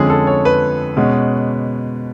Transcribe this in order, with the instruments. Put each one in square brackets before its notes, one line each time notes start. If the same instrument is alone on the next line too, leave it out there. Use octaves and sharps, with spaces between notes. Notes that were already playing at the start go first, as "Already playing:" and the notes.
Already playing: [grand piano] F2 D3 F3 G#3 C#4 G#4
A4
C#5
B4
B2 G#3 C#4